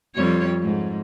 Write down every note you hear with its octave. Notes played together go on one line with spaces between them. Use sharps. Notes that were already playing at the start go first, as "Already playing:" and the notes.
F2 G3 C#5
G#2